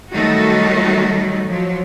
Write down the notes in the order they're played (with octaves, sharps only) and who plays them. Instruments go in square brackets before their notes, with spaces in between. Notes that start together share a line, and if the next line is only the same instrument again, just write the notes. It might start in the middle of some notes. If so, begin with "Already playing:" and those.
[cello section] D#3 F#3 G3 A3 D#4 F#4
F3 F#3